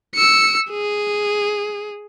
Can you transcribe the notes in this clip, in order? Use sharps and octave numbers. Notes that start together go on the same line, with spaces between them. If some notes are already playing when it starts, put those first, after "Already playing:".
E6 C#7
G#4